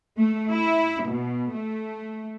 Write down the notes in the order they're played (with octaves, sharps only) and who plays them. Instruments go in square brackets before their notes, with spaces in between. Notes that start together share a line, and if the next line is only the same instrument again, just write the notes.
[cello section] A3
E4
B2
A3